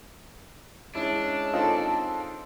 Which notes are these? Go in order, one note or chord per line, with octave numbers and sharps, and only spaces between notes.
G#3 C#4 D4 E4
C4 D#4 F4 A4 D#5